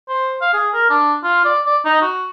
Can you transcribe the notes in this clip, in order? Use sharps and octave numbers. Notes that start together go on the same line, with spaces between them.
C5
F5
G#4
A#4
D4
F4
D5
D5
D#4
F#4